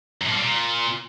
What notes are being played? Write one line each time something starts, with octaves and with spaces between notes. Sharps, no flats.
F#2
A2
A#3
G3
A#2